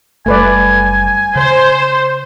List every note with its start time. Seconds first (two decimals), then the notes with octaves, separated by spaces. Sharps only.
0.26 F#1 G3 A3 B4 D5 G#5
1.36 C#3 C5